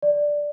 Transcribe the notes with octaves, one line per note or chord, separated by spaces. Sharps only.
D5